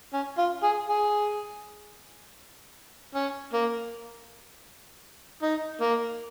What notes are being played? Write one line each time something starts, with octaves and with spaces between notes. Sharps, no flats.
C#4
F4
G#4
G#4
C#4
A#3
D#4
A#3